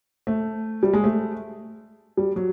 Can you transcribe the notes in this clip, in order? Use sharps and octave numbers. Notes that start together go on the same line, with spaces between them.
A3
G3
G#3
A3
G3
F#3